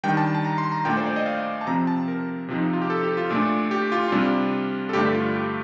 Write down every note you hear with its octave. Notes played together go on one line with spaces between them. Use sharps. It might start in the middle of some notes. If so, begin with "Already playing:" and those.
D#3 G3 D4 G5
A5
A5
A#5
C6
A#5
A#2 A3 D4 G5
C5
D5
D#5
F5
A5
C3 F3 C4 A#5
A5
A#4
C3 F3 C4 D#4
F4
G4
A4
G4
F4
A#2 A3 D4
G4
F4
C3 G3 D4 F4
A4
G2 D3 A3 D4 G4
F4
G4